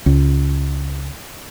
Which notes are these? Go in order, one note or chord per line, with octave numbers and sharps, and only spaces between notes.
C#2